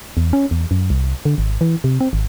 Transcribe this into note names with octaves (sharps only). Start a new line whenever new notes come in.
E2
C#4
E2
F#2
C2
D3
G#1
E3
C3
C4
G#1